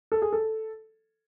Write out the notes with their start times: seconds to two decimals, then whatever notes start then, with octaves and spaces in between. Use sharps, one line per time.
0.12 A4
0.22 G#4
0.33 A4